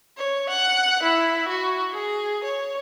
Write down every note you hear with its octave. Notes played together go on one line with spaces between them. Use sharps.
C#5
F#5
E4
F#4
G#4
C#5